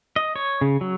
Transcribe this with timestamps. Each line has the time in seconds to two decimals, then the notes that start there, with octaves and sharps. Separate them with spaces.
0.16 D#5
0.36 C#5
0.61 C#3
0.81 F#3